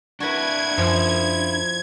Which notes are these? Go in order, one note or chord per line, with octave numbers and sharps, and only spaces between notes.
D4 E4 F#4 B4 G#6
F#2 F3